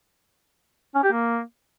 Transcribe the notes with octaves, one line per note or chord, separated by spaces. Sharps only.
C#4
G4
A#3